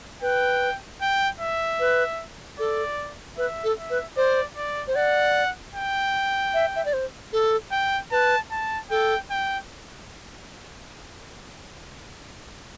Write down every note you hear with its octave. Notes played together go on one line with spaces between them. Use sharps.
B4 G5
G5
E5
B4
A4 D5
B4 E5
A4
E5
B4
C5 D5
D5
C5
D5 F#5
G5
E5
E5
D5
C5
A4
G5
B4 A5
A5
A4 G5
G5